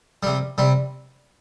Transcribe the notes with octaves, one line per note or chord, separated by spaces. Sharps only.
C3 G3
C3 G3